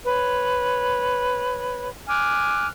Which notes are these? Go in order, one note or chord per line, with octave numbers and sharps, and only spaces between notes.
B4 C#5
G#5 D6 F6 F#6